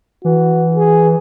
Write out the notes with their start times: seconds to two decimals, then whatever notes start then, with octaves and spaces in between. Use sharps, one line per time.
0.25 E3 F#4
0.75 G#4